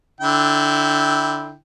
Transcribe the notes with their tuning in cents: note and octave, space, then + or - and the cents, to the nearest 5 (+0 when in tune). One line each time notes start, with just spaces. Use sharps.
D3 +0 E4 -20 G5 +0